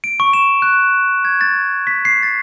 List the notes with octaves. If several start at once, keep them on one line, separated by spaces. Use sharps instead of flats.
D7
C#6
E7
F#6
G#6
A6
B6
C7
A6